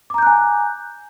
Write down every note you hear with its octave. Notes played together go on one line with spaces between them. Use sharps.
G#5 A#5 D6 F#6 G6